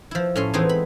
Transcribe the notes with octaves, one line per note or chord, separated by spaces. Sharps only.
F3 E4
A2 C#4 C6
E3 G#3 B3 C4 D#4
B5